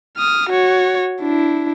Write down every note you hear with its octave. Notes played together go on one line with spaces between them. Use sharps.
D#6 F6
F#4 C#5
D4 E4